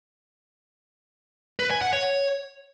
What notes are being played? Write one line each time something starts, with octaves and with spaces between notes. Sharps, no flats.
B4
G#5
F#5
C#5